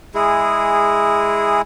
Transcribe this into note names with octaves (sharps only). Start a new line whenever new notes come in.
G#3 E4 G#4